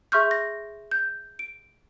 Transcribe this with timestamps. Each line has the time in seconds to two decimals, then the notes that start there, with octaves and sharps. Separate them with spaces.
0.12 G#4 E5 C6 C#6 F6 G6
0.31 A#6
0.91 G6
1.39 D7